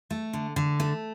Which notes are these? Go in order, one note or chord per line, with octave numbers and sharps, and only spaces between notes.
A3
D3
D3
A3